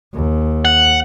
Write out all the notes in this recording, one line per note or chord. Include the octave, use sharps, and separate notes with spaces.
D#2
F#5